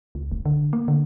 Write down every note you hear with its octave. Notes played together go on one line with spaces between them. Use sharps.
C#2
F1
D3
A#3
D3